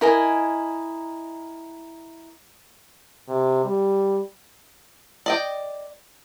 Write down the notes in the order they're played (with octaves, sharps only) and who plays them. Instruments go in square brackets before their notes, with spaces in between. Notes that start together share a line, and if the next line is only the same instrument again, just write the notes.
[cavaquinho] E4 A#4 D#5 G#5
[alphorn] C3
G3
[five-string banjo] D5 D#5 G5